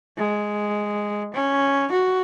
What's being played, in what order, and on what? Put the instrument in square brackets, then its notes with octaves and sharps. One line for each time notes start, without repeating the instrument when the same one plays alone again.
[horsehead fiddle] G#3
C#4
F#4